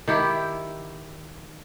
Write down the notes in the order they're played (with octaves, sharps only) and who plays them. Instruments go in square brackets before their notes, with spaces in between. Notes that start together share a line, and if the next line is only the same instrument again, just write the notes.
[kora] D#3 E4 G4